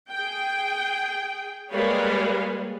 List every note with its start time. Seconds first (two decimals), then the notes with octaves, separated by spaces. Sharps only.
0.11 G#4 G5
1.71 G3 G#3 A#3 B4 C#5 F5